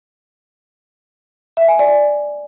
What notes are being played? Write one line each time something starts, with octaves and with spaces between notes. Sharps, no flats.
E5
G#5
D5